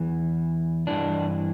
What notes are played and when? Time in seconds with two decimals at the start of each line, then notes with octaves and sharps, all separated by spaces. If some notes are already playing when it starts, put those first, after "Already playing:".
Already playing: E2 E3
0.87 G2 E3 D4